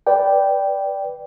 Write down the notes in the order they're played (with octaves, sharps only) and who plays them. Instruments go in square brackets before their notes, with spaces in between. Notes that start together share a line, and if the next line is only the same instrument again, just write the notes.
[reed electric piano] B4 D5 G5